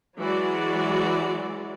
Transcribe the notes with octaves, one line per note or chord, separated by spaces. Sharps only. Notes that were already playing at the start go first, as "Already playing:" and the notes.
E3 F#3 G#3 F#4 D5